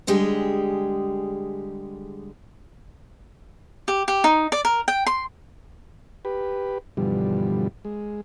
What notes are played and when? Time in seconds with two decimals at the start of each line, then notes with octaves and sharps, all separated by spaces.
0.07 D3 G3 G#3 G4 G#4
3.88 G4
4.08 G4
4.24 D#4
4.52 D5
4.65 A#4
4.88 G5
5.06 C6
6.25 G4 B4
6.97 G2 B2 D3 E3 F3 G3
7.85 G#3